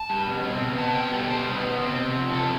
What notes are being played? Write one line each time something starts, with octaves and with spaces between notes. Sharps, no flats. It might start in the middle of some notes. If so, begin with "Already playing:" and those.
Already playing: A5
G3
B2
C4
B2
B3 A5
B2 G5
G3 A4
B2 C5
B3
B2
C4
C3
F3
C3 A4